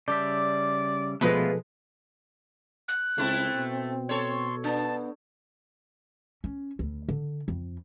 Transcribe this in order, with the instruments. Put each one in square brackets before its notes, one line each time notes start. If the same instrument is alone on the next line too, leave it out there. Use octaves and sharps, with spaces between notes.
[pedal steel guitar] C#3 G3 E5 [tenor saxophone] D5 [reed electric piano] A5 G6
[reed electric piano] B2 F3 A4 [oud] G#3 B4 [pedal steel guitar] A3 B3 F4
[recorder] F#6
[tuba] C#2 [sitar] A3 E4 A4 [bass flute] C4
[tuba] B2
[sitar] A4 C#5 [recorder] C6
[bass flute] B3 [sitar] D4 [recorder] A5
[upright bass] C#4
D2
D3
F2